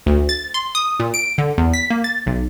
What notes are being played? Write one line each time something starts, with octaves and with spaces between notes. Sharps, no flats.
D2
A6
C6
D#6
A#2
D7
D3
E2
B6
A#3
A6
B1